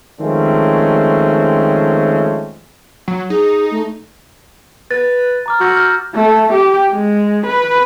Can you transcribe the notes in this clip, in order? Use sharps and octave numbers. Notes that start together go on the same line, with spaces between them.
D#3 F3 G#3 A3 C4 C#4
F#3
D#4 G#4
A3
B4 A6
A#5 D6 F6
F#4 E6 G6 A#6
F6 G6
A3
G4
G#3
B4